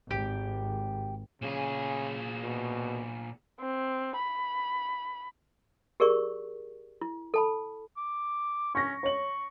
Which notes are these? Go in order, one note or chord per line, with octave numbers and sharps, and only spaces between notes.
G#1 G4
A#2 C#3 G#4
B2
C4
B5
G4 G#4 A#4 D5 C#6
E4
A4 A5 B5
D6
C#4 C#6 A#6
C#5 C#6 F#7